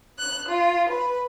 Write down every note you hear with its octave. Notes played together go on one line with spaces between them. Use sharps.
F#6
F4
B4